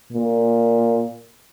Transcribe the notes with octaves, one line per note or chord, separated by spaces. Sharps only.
A#2